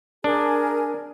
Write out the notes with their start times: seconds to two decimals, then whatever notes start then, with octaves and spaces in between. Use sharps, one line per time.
0.24 D4 G#4 A#4 G#5